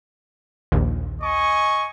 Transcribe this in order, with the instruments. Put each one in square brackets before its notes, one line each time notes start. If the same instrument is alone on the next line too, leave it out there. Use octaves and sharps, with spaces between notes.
[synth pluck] A#1 D#2
[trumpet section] D#5 G#5 C#6